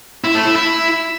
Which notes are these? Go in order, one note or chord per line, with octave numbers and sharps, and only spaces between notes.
E4
A3
E4
E4